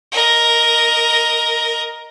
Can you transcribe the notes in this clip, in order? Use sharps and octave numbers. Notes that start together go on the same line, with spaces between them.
A#4 D#5